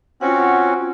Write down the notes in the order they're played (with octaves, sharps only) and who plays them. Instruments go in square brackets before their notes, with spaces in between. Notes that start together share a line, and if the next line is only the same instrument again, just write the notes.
[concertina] C4 C#4 F#4 [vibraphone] F4 F#5